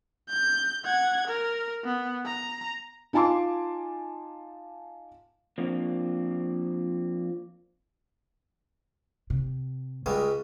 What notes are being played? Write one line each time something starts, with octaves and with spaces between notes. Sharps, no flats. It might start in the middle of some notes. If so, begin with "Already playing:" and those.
G6
F#5 G#6
A#4
B3
A#5
D#4 F4 G#5 A5 C6 D6
F3 A#3 C4 D4
C3
C#2 G3 G#3 C#4